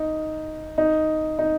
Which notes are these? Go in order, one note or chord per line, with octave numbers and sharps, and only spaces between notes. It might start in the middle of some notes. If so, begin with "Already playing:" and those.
Already playing: D#4
D#4
D#4